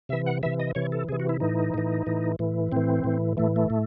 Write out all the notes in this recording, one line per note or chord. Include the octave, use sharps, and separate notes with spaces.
C3 E3 E5
F#5
C3 E3 E5
D#5
C3 E3 C#5
A4
C3 E3 G#4
F#4
E4
A2 E3 D#4
A2 E3
A2 E3
A2 E3
A2 E3 C4
A2 E3
A2 E3 A3
A3
A2